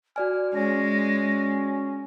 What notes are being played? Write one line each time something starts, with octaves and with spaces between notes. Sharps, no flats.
F#4 D5 G#5 F6
G#3 C#4 A#6